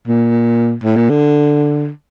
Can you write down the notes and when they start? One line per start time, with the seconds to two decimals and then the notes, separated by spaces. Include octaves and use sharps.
0.08 A#2
0.83 A2
0.97 A#2
1.09 D3